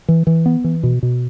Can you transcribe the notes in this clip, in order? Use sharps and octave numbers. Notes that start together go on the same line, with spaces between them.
E3
E3
B3
E3
B2
B2